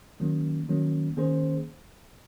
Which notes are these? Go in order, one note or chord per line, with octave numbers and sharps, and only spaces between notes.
D#3 F#3 A#3 C#4
D#3 F#3 A#3 C#4
D#3 A#3 C#4 G#4 C5